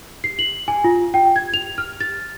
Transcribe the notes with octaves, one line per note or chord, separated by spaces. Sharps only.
C7
F#7
G#5
F4
G5
G#6
F7
F6
A6